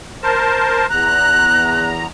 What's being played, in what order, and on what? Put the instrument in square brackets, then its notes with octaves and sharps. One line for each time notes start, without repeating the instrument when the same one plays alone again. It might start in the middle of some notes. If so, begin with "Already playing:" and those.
[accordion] A#4 C5 A5
[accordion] E2 A#5 [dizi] F#6